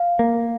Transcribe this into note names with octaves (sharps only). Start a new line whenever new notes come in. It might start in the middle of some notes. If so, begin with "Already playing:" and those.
Already playing: F5
A#3